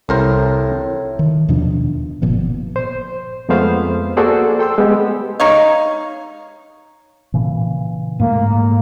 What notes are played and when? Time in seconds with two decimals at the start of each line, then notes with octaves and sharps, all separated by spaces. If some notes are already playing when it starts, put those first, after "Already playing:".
0.09 C2 A2 A#4 C5
1.19 D#3
1.49 D#2 B2 F3 D4
2.22 G1 A#2 F3 B3
2.76 C5
3.49 F2 G#3 A3 B3 C5 F5
4.17 A#3 F#4 G#4 A4 C5 D5
4.59 A4 G5 C6 E6
4.78 G#3 B3 G4
5.40 D#4 C#5 F5
7.34 A#2 C#3 E3
8.20 G#2 A3 A#3